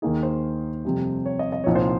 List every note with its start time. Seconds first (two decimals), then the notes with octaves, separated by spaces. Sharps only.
0.02 D#2 D#3 A#3 D#4 G#4
0.23 C5
0.85 F2 C3 G3
1.26 C#5
1.39 D#5
1.52 D#5
1.64 C2 A#2 F3 C4 D#4 C#5
1.75 C5